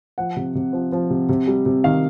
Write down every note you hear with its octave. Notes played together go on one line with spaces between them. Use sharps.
F3 F#5
C3
C3
F3
F3
C3
C3
G3
C3
D#3 F5